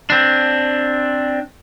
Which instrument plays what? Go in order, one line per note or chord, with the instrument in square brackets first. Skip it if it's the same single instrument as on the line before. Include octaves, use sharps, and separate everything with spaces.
[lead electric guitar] C4 D4